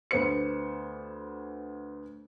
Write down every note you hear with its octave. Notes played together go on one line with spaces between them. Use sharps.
D2 B3 C5 C#7